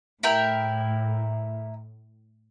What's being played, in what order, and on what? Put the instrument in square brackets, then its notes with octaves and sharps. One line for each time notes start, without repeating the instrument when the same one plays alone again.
[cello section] A2 [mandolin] E4 A#4 G5